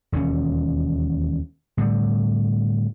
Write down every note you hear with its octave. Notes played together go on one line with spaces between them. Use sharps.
E1 D#2 C4 C#4
A2 D3 G3